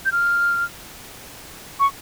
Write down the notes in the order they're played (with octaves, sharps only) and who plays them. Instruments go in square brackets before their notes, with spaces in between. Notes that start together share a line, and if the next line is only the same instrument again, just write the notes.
[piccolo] G6
F6
C#6